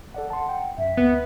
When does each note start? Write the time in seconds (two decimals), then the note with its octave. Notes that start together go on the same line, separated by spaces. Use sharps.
0.14 A4 D5 F#5
0.30 F#5 A5 C6
0.49 G5
0.78 F#2 E5
0.97 D2 B3